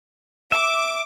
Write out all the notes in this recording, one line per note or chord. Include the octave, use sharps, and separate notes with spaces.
E5 D6